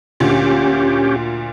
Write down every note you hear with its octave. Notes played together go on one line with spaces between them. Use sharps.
D2 A#2 C#4 G4